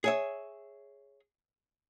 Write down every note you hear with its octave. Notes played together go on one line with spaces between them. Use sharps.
G#4 C#5 E5